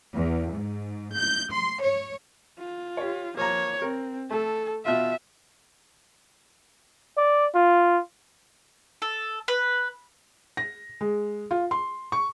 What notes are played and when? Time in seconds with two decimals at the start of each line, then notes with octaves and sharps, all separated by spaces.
0.14 E2
0.52 G#2
1.15 G6
1.51 C6
1.81 C#5
2.59 F4
2.97 G4 C#5
3.37 F3 A#3 C#5 A#5
3.82 C4 A#4
4.30 A3 A4
4.85 B2 F4 E5
7.17 D5
7.55 F4
9.02 A4
9.48 B4
10.57 A#6
11.01 G#3
11.51 F4
11.71 C6
12.12 C#6